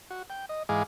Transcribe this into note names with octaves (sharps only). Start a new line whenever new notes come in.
F#4
G5
D#5
G#2 E3 G#3 G#4 F5 D6